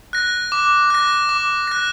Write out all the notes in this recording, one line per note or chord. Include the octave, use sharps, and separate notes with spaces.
F#6 A#6
D6
F#6 A#6
D6
F#6 A#6